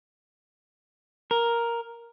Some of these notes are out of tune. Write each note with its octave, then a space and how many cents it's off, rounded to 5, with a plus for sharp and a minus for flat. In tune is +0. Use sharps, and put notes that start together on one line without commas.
A#4 +5